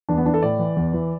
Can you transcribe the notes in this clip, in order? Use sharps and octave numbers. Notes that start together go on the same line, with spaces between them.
E2 D4
B3
E3 D4
A4
A2 D5
E3
E2
E3